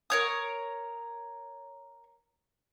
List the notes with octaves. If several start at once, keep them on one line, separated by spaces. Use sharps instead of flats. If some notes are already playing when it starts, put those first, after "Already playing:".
A#4 C#5 D#6